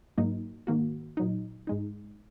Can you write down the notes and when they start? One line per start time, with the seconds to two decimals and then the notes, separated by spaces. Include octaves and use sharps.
0.18 G#2 F#3 A#3 D#4
0.67 G#2 D#3 A#3 F#4
1.17 A#2 F#3 D#4
1.67 G#2 G#3 D#4